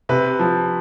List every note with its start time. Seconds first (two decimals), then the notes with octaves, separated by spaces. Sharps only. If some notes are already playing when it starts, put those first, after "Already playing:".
0.09 C3 B4
0.39 F3